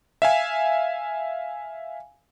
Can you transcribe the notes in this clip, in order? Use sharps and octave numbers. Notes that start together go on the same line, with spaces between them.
E5 F5 G#5